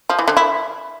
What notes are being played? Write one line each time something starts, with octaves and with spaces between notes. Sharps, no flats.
F3
E3
D3
E4